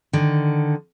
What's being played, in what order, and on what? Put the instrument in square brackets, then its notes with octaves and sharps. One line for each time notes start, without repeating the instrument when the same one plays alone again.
[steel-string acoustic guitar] D3 D#3